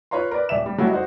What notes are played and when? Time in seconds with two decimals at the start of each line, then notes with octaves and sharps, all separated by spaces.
0.11 F4 B4 C#5 F5 A#5 C6
0.31 A#4 B4 D5
0.49 D#1 D5 E5 E7
0.66 G3
0.78 F#3 G3 A3 E4 F#4 A4
0.91 D#4 F#4 C5